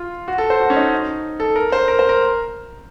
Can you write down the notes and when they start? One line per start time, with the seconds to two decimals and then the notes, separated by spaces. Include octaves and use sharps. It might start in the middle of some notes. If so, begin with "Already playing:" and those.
Already playing: F4
0.28 F#4
0.38 A4
0.50 C5
0.60 F#4
0.70 C#4
0.76 D#4
1.40 A4
1.56 A#4
1.72 C5
1.88 A#4
1.99 C5
2.09 A#4